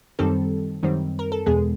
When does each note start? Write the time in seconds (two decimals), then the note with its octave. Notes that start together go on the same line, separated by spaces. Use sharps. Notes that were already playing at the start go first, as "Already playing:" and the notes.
0.19 F#2 D#3 G3 C4 A4
0.83 F#2 D#3 G3 C4
1.19 A#4
1.32 A4
1.46 E2 B2 G#3 B3 G#4